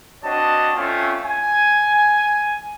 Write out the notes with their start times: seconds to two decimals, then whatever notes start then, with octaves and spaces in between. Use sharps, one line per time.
0.23 C4 D4 F#4 C#5 D#5 A5
0.75 A3 C4 C#4 F4
1.24 G#5